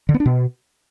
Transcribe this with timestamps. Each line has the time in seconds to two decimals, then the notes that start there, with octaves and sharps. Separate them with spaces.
0.09 D3
0.14 B3
0.20 D4
0.26 B2